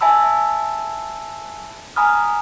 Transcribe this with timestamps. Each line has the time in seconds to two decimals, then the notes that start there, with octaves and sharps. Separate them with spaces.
0.01 E5 G#5 A5 B5 E6
1.96 G#5 A#5 B5 D#6 F6